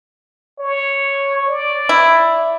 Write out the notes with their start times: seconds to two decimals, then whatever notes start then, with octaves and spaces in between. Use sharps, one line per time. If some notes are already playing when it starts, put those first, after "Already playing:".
0.59 C#5
1.47 D5
1.89 E4